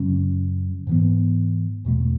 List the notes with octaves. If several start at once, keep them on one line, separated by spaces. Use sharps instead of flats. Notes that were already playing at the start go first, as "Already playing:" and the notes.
Already playing: F#2 C#3 F#3 C#4
G#2 E3 B3
E2 B2 A3